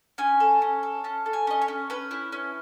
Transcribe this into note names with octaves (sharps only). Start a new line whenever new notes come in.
C#4 G#5
A4
C#4
A4
C#4 A5
A4
G#5
C#4 D#5
C#5
C#4
C#4 B4
E4
C#4